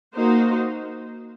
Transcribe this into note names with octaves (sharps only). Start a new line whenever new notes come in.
A#3 D#4 F#4 C5